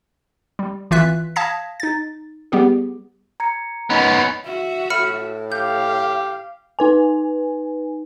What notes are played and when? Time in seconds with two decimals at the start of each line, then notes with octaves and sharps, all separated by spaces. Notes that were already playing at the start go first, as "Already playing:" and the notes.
0.59 G3
0.91 G#1 E3 F4 E5 F#6 B6
1.36 F5 A5 D#6 G#6 A#6 B6
1.80 D#4 A6
2.52 G3 B3 G4 G#4
3.40 A#5 G#6 C#7
3.90 B3 C#4 D#4 D#5 F#5
4.45 F#4 E5
4.90 A2 B5 F6 C#7
5.52 G4 F5 G6
6.79 D#4 B4 G#5